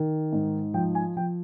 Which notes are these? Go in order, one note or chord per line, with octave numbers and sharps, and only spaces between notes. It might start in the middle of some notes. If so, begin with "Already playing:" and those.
Already playing: D#3
G#2
F3 G5
G#5
F3 G5